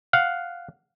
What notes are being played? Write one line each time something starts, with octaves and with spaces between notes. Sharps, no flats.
F5 F#5